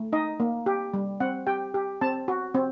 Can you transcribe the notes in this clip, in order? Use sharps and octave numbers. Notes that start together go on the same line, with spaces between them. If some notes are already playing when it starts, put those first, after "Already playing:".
Already playing: A3
D#4 D#5
A#3
G4
G3
C4 F#5
G4 G5
G4
C4 A5
F#4
C4